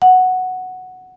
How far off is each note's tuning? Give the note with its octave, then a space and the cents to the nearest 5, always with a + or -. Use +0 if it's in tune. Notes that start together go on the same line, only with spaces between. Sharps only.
F#5 +0